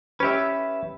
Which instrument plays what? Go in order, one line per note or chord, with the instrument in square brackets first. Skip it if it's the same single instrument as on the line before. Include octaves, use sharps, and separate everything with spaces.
[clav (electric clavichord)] C#4 G4 [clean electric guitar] B4 E5